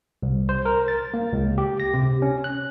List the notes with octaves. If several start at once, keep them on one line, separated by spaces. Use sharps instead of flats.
C2
C5
A#4
A6
A#3
C#2
G4
A#6
C3
C#4
F#6